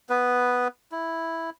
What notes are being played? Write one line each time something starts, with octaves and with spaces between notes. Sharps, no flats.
B3 B4
E4